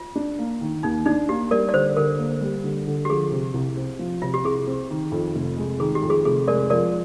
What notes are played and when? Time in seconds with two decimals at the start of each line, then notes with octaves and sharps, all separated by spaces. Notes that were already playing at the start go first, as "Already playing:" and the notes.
Already playing: F4
0.16 D4
0.39 A#3
0.61 D#3
0.83 D#2 D#4
1.06 D4 D#4
1.29 A#3 G4
1.51 G3 A#4 D5
1.69 D5
1.73 D3 C5
1.97 D3 A#4
2.18 A#3
2.41 G3
2.64 D3
2.87 D3
3.05 G4
3.10 F3 G#4
3.31 C3
3.54 C2
3.77 C4
3.99 F3
4.22 C3 F4
4.34 G4
4.44 C2 G#4
4.67 C4
4.90 D#3
5.12 F2
5.35 F1
5.58 G#3
5.80 D#3 G#4
5.95 G4
6.03 F2
6.10 G#4
6.25 F1 G#4
6.48 G#3 A#4 D5
6.70 F3 A#4 D5